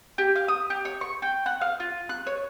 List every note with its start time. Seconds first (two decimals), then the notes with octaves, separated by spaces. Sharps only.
0.18 G4
0.36 F5
0.48 D#6
0.70 G4
0.85 C#5
1.01 C#6
1.22 G5
1.46 F#5
1.61 F5
1.80 F4
2.09 F#6
2.27 C#5